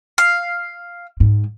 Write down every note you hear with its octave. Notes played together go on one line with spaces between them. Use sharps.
F5
G#2